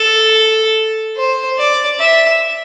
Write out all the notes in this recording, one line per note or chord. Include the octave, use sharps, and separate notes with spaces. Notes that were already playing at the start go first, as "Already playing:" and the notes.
Already playing: A4
C5
D5
E5